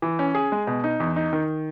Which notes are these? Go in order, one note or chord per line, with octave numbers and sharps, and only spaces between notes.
E3
C#4
G#4
G#3
B2
D#4
E2
D#4
D#3